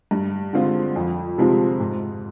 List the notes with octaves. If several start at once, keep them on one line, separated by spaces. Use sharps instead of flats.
G2
D3 G#3 C4 F4
F2
C3 F3 G#3 C4
G#2